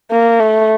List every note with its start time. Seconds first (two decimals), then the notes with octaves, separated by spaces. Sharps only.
0.11 A#3
0.40 A3